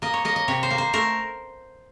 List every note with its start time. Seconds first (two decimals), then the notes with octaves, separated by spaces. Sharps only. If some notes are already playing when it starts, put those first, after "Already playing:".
0.02 A#3 D#5
0.14 C#5
0.25 A#3 D#5
0.36 D#5
0.48 C3 C#5
0.63 C5
0.70 A#3
0.78 C5
0.93 A3 A#4